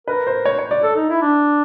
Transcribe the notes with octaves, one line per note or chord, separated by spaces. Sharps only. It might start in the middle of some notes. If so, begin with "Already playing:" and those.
A#4 B4
C5
C#5
C#5
D5
A4
D#4
E4
D4